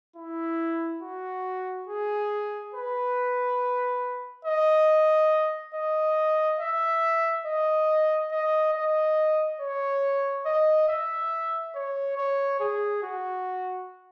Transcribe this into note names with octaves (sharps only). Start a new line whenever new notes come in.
E4
F#4
G#4
B4
D#5
D#5
E5
D#5
D#5
D#5
C#5
D#5
E5
C#5
C#5
G#4
F#4